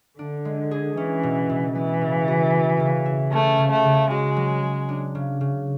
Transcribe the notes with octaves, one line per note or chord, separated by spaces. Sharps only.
D3 D4
G#3
G#4
E3 C#4
B2
B2
E3 B3
C#3
F#4
B3
C#3
E4
A3 C#4
C#3
A3
C#3
G#3 F#4
F#3
F#3
D4
C#3
C#3